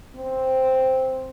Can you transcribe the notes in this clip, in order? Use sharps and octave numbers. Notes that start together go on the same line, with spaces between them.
C4